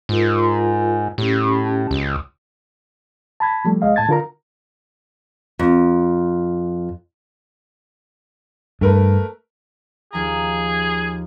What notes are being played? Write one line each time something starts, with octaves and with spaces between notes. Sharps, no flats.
G#2 F4 A#4
A2 C#4 G4
C#2
A5 B5 G#6
F3 G3 A3
C2 G#3 D#5 F5
A2 A5 G#6 A6
D3 F4 A#4 A#5
F2
G2 A3 A#4 B4
D#2 F3 G#4 A#5